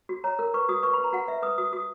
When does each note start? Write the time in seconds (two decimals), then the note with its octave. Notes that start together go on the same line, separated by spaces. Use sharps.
0.09 F#4
0.24 C#5 A#5
0.39 A#4
0.54 B4 C#6
0.68 F#4 D#6
0.83 B4 C#6
0.93 B4 B5
1.04 A#5
1.13 F#4 F#5
1.27 B4 E5
1.42 B4 D#6
1.58 F#4 D#6
1.72 F#4 D#6